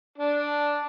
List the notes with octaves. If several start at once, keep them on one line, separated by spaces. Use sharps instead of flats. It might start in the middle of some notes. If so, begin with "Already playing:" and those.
D4